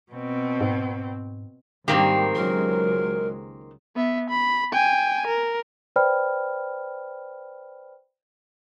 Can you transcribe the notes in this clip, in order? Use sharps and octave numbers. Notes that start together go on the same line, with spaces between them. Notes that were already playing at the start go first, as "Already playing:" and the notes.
B2 C4
G#2
G#2 D#3 G3 A#3 C4 G4
C#2 F#3 G#3 A#4
B3 E5
B5
G5 G#5
A#4
B4 C5 D5 G5 B5 F6